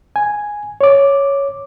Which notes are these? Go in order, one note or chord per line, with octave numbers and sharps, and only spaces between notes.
G#5
C#5 D6